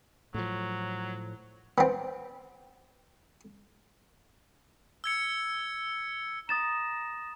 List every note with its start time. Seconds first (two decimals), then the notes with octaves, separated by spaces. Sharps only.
0.34 A2 F3 F#3
1.78 B3 C4
5.04 E6 G#6 C#7
6.49 A#5 D#6 A6 E7